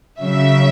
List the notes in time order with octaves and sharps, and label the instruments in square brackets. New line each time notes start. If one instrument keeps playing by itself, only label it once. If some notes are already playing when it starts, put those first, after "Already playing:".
[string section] C#3 F#3 E5